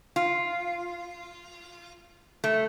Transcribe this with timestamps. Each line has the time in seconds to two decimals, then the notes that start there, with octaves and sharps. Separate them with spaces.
0.16 F4
2.44 A3